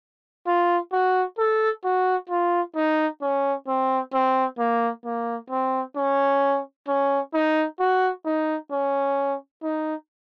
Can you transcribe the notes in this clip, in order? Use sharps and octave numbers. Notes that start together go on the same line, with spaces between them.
F4
F#4
A4
F#4
F4
D#4
C#4
C4
C4
A#3
A#3
C4
C#4
C#4
D#4
F#4
D#4
C#4
D#4